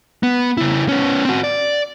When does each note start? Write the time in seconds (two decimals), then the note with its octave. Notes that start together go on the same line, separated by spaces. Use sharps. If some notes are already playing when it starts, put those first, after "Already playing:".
0.23 B3
0.57 C#3 E4
0.88 B3 C#4
1.25 C4 F#4
1.44 D5